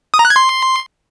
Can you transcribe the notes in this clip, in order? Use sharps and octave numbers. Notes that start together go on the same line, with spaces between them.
D#6
A#5
F#6
G#6
C6